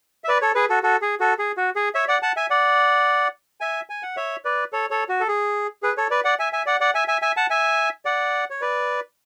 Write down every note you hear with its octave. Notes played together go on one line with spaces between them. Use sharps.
E5
B4 D5
A4 C#5
G#4 B4
F#4 A4
F#4 A4
G#4
F#4 A4
G#4
F#4
G#4
C#5 E5
D5 F#5
F#5 A5
E5 G#5
D5 F#5
E5 G#5
G#5
F#5
C#5 E5
B4 D5
A4 C#5
A4 C#5
F#4
A4
G#4
G#4 B4
A4 C#5
B4 D5
D5 F#5
E5 G#5
E5 G#5
D5 F#5
D5 F#5
E5 G#5
E5 G#5
E5 G#5
F#5 A5
E5 G#5
D5 F#5
C#5
B4 D5